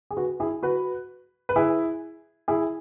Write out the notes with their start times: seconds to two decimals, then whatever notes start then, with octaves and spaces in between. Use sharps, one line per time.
0.11 G#4
0.17 F#4 B4
0.40 E4 G#4
0.63 F#4 B4
1.49 B4
1.56 E4 G#4
2.48 E4 G#4